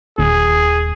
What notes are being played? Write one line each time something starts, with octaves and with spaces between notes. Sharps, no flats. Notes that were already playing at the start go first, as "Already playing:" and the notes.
D#1 G#4